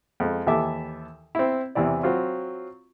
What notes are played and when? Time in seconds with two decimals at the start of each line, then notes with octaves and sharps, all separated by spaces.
0.20 F2 G#3
0.47 D#2 E3 G4 A4 E5 D6
1.35 C4 E4
1.75 E2 C3 E3 E4 D5
2.03 F#3 C4 F4